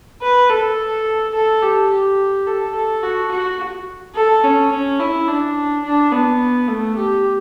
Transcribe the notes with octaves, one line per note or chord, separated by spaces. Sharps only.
B4
A4
A4
G4
G4
A4
A4
F#4
F#4
A4
C#4
C#4
E4
D4
D4
B3
A3
G4